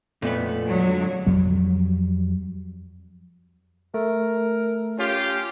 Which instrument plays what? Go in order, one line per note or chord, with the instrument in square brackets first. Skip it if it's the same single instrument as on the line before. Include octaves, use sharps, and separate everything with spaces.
[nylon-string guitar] F2 [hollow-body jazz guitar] A#2 A3 B3
[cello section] D3 F#3 G#3
[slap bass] F2 F#3 G3
[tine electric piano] A3 [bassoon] A#4
[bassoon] C#4 [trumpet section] F4 G4